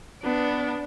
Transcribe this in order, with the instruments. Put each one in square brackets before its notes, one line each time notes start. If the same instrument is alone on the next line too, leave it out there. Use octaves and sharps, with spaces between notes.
[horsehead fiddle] B3 [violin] D4